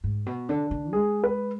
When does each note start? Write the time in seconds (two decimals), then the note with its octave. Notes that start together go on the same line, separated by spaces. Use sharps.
0.04 G#2
0.26 B2
0.49 D3 D4
0.71 D3
0.93 G#3 G#4
1.24 B4